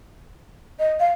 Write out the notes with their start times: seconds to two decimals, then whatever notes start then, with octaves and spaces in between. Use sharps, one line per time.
0.79 D#5
1.00 F5